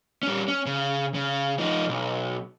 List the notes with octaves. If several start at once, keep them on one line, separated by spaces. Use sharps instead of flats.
G3 C#4
C#4
C#3
C#3
F3 D#4
B1